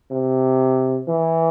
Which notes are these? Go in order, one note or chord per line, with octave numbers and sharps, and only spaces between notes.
C3
E3